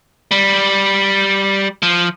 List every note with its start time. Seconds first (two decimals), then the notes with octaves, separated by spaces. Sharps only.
0.31 G3
1.83 F3